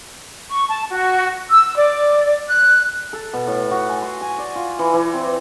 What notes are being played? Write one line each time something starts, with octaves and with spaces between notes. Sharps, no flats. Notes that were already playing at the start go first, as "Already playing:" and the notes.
C#6
A5
F#4
E6
D5
F#6
A4
B2
A2
F#4
G#5
C6
G#5
D5
F4
E3
E3
C4